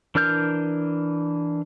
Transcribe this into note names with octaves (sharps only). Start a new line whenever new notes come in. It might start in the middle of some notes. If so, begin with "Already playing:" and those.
E3 D4 A#4 F6 G6